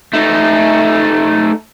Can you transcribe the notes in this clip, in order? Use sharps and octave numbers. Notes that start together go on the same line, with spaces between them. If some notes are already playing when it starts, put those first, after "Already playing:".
A3 D#4